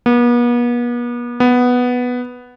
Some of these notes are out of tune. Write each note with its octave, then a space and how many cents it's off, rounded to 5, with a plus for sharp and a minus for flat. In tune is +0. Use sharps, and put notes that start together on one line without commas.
B3 -40
B3 +0